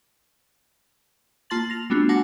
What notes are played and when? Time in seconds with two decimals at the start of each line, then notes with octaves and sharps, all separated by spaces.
1.50 A#3 F4 A5 C6 A6 F#7
1.70 A#6 F7
1.90 G3 A3 B3 D4 F4 F#4
2.09 F#4 F#5 G#5 A5 D6 A#6